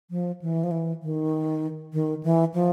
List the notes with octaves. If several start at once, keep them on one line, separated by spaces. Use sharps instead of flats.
F3
E3
F3
E3
D#3
D#3
E3
F3